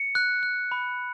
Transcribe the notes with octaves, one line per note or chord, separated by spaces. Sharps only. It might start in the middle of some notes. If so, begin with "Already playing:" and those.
Already playing: C#7
F#6
F#6
B5